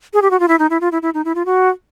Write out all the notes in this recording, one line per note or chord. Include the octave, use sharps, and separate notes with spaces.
G#4
G4
F#4
F4
E4
D#4
E4
F4
E4
E4
D#4
E4
F4
F#4